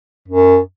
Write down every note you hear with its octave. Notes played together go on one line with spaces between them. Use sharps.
F#2